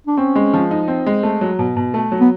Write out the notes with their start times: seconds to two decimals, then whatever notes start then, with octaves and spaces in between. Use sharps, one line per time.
0.07 D4
0.18 C4 C#4
0.36 G#3
0.54 F3
0.71 D#4
0.88 C4
1.06 G#3
1.23 A3
1.41 F#3
1.59 B2
1.77 B2
1.94 A3
2.12 F#3
2.20 B3